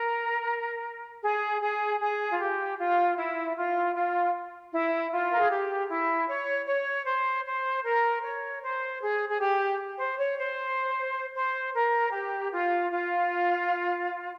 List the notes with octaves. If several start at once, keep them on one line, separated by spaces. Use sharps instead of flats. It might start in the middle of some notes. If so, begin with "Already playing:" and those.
Already playing: A#4
G#4
G#4
G#4
F4
G4
F4
E4
F4
F4
E4
F4
A#4
G#4
G4
E4
C#5
C#5
C5
C5
A#4
C#5
C5
G#4
G#4
G4
C5
C#5
C5
C5
A#4
G4
F4
F4